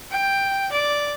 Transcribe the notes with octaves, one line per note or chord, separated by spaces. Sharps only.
G5
D5